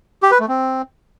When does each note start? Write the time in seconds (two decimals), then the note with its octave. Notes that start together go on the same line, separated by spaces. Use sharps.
0.23 G4
0.31 B4
0.40 A3
0.48 C4